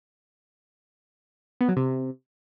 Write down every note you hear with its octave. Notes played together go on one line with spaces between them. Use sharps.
B3
F#3
C3